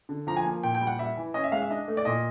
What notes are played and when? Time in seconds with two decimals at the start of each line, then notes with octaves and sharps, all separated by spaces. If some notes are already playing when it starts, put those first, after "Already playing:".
0.09 D3
0.27 F3 A#5
0.36 G#5
0.45 A#3
0.63 A#2 G5
0.75 G5
0.81 G3
0.87 F#5
0.99 G3 E5
1.17 E3
1.34 C#4 D#5
1.44 E5
1.52 G#3 F5
1.62 E5
1.70 D4 D#5
1.88 A3
1.97 D5
2.05 A#2 D#5